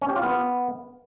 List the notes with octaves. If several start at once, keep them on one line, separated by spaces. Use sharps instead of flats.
C#4
G4
F4
B3